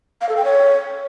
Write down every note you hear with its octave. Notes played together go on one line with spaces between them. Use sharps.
F5
A4
G5
C#5